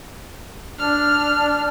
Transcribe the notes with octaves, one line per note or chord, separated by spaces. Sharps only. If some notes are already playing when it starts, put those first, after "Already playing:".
D4 F6